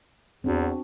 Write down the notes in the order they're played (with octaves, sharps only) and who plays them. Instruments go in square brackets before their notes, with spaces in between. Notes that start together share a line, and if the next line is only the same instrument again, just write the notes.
[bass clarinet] E2 [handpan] C4 D4 F#4